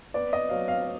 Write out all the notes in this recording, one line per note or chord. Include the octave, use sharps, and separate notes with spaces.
B3 D5
D#5
F#3 F5
F5